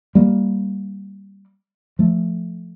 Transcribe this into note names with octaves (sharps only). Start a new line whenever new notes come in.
G3 A#3
F3 A3